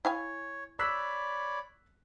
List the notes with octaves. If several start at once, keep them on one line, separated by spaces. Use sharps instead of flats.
E4 C#5 F5 G#5
C#5 D5 B5 E6 F#6 B6